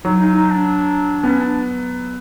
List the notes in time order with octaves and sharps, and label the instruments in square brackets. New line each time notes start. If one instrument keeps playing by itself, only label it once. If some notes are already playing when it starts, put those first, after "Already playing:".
[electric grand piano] F#3 [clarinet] D#4
[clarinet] D#4
D#4
D4
[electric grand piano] B3 [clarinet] C#4
[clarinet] D4